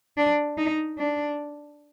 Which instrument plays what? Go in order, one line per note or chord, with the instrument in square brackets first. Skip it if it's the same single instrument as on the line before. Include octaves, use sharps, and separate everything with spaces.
[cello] D4
D#4
D4